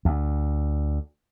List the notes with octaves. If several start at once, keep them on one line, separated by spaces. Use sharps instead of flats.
D2